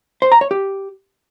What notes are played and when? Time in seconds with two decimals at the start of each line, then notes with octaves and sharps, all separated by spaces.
0.22 C5
0.32 A#5
0.41 C#5
0.51 G4